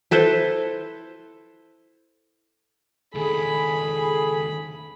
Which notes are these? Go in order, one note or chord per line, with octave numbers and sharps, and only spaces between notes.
E4 A4 B4 C5
C#2 D#3 G#4 A4 B5